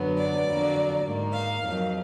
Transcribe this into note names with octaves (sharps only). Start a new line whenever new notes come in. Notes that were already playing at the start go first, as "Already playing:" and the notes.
Already playing: F#2 D3 F#3 B3
D5
F2 D3 F#3 A#3
G#2 D#3 A#3
F5
F2 D#3 F#3